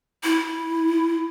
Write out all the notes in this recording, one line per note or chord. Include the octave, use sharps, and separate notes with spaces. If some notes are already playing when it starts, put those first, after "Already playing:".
E4